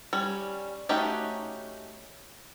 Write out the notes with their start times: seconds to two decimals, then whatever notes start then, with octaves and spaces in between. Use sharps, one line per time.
0.13 G3 C#4
0.89 A3 C#4 D#4 F#4 G4